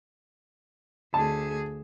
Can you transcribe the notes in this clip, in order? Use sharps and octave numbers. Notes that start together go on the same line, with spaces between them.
D2 G#4 A5